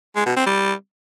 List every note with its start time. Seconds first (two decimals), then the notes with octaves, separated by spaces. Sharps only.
0.16 G#3
0.26 B2
0.36 C4
0.46 G3